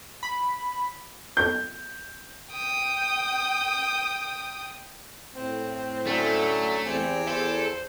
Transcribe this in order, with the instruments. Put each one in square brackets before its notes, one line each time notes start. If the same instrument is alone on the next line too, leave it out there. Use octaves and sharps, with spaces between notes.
[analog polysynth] B5
[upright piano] G6
[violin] G5 D#6
[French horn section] A2 [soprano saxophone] C4
[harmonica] D3 F#3 C#4 [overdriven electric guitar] A3
[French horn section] E2 [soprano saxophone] C4 [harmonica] G4 G#5
[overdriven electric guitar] A4 [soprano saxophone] C5